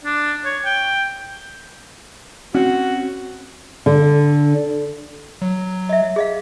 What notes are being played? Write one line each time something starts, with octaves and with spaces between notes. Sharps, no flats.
D4
C#5
G5
C4 C#4 F#4
D3
F#3
D#5 E5
G#4 D#5 F5